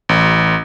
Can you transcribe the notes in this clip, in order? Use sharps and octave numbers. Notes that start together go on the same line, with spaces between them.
A1